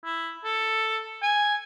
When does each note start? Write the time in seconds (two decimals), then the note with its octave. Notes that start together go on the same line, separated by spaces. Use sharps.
0.04 E4
0.45 A4
1.23 G#5